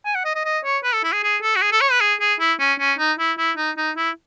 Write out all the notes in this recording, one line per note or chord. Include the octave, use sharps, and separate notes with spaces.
G#5
F#5
D#5
D#5
D#5
C#5
B4
A4
E4
G#4
G#4
A4
F#4
G#4
A4
C#5
B4
G#4
G#4
E4
C#4
C#4
D#4
E4
E4
D#4
D#4
E4